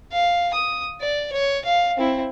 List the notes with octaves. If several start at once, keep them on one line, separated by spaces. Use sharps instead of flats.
F5
D#6
D5
C#5
F5
C4 E4